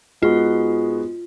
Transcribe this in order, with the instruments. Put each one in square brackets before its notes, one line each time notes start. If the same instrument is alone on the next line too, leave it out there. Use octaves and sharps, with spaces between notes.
[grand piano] G#2 G#3 B3 F#4 [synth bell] F4